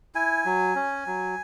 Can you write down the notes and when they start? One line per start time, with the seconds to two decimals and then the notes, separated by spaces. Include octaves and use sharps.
0.15 E4 G#5
0.45 F#3
0.75 C#4
1.06 F#3